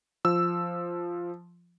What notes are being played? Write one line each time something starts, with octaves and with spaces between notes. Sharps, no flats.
F3 E6